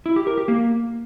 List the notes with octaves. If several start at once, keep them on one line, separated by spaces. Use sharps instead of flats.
E4
G4
A#4
G4
A#3